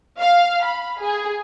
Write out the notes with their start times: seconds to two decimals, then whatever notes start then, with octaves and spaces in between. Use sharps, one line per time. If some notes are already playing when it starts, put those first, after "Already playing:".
0.20 F5
0.65 B5
1.01 G#4